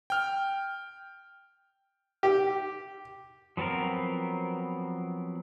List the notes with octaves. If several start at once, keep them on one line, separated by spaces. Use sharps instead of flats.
G5 F6
G4
F3 F#3 B3 C4 A#4